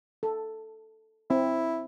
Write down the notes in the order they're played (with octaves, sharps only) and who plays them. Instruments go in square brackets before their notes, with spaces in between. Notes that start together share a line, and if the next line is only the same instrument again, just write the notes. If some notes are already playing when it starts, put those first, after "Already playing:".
[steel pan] A4
[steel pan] C4 [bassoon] E4